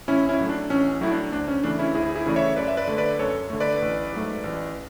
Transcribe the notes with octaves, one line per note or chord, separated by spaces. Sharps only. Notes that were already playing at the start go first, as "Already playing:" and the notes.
A1 C#4 E4
C#4 E4
A2 F#3 A3
D4
A1 C#4
A2 F#3 A3 E4
D4
D2 D4
C#4
C#3 E3 A3 D4
C#4 E4
D2 E4 G#4
E4 G#4
C#3 E3 A3 D5
C#5 E5
F#2 B4 D5
E5
B4 D5
D3 A3
B4 D5
F#2 A4 C#5
D3 A3
B4 D5
A1
G#2 F#3 A3
A1